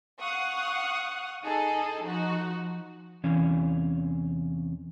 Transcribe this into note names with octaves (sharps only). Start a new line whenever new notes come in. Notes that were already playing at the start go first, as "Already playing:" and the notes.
F5 F#5 C#6 D#6
D#4 G#4 A4
F3 D#4 F#4
E2 C3 E3 C#4 F5 G#5